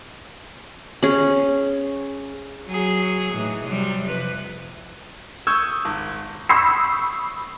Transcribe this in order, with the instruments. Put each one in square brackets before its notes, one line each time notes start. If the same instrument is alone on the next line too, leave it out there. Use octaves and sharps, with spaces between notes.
[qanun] C#4 G#4
[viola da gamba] F#3 G#4
A2 E3 D#4
C3 F#3 G3
F2 C3 B4
[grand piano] C#6 D#6 E6 G6 G#6
G#1
[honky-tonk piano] B5 C#6 D#6 E6 G6 C7